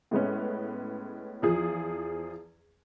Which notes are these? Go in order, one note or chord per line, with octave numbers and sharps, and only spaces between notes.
A2 G#3 B3 C#4
E2 F3 G#4